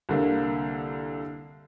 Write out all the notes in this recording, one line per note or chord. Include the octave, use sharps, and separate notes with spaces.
C2 D3 A#3